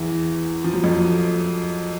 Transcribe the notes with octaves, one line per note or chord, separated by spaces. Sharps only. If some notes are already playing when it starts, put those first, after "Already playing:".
Already playing: E2 E3
F3
F#3
F2 F3